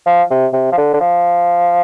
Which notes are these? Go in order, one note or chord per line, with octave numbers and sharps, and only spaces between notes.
F3
C3
C3
F3
D3
D3
F3